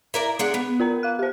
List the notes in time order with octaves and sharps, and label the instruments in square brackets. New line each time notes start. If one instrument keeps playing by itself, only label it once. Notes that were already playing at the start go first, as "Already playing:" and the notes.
[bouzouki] E4 A#4 D5
G#3 D4 F#5
B3
[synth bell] F4 A#4 A#5
F5 F#6
G4 C5